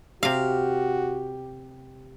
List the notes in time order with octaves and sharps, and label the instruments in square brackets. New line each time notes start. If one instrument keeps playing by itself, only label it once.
[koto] C3 F5 [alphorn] F#4 [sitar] G4